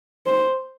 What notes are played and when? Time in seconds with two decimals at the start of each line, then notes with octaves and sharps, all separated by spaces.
0.26 C5